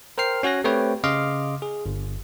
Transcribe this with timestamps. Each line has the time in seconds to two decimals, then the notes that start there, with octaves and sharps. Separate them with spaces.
0.18 A#4 C5 G5 F6 C7
0.43 C#4 F#4 G#5 F#6 A#6
0.64 A3 C4 G4 B4 C#5 G5
1.04 C#3 D#5 F5 C6 D6 F6
1.62 G#4
1.86 G1